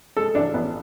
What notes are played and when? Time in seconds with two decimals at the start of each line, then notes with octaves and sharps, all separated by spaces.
0.17 G#3 A4
0.35 A1 D4
0.54 A1 B3